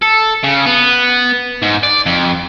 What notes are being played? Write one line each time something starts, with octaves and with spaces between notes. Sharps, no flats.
A4
C#3
B3
G#2
D5
F2